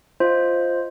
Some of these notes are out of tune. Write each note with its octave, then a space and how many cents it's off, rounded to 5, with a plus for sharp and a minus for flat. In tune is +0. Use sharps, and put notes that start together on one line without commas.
F4 +0 C5 +0 D#5 +0